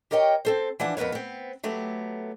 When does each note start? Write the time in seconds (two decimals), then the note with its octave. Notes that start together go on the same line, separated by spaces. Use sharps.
0.11 G4 A#4 C#5 D#5 F5 G5
0.45 C4 A4 C5
0.80 E3 F3 D4 F#5
0.97 F2 B3 A#4 B4 C#5
1.12 B3 C4
1.63 F#3 A3 B3 G4